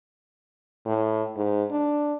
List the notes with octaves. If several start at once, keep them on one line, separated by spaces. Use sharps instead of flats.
A2
G#2
D4